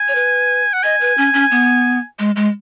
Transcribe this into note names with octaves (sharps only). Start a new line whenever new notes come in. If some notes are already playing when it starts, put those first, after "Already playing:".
Already playing: G#5
C#5
B4
F#5
D#5 G#5
B4
C#4
C#4
B3
G#3
G#3